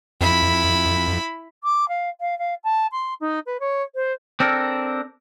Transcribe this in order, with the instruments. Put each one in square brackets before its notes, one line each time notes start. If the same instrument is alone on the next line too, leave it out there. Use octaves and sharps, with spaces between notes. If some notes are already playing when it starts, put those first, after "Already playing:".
[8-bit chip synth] F2 [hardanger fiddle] E4 B5
[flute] D6
F5
F5
F5
A5
C6
D#4
B4
C#5
C5
[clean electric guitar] C4 D4 A4 A#4